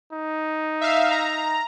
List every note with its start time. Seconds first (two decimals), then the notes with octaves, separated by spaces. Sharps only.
0.13 D#4
0.81 E5 F5
1.11 A#5